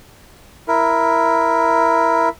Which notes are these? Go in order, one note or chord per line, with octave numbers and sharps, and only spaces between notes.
E4 A#4